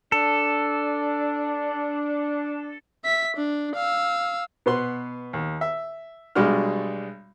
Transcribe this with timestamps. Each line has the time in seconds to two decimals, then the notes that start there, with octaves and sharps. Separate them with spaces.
0.12 D4 A4
3.04 E5 B6
3.37 D4
3.75 F5 E6
4.66 B2 B3 C6 F#6
5.33 D#2
5.61 E5
6.35 B1 G3 G#3 D4 F#4 F6